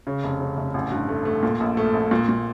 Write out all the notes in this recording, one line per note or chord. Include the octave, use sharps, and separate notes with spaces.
C#3
F1
C#3
F1
A1
G2
A3
A3
A#2
A#1
A3
A#1
A#2
A#2